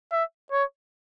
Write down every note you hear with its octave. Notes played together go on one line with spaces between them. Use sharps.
E5
C#5